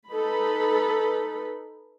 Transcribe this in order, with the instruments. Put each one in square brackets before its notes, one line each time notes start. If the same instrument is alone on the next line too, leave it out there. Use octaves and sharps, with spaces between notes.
[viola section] D#4 A4 B4 B5